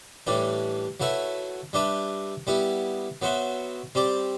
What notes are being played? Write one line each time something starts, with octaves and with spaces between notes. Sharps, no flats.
A2 E3 G3 D4 G4
F#3 A3 E4 B4 E5
G3 D4 G4 B4 E5
G3 B3 E4 G4
F#3 B3 F#4 C5 E5
G3 C4 G4 D5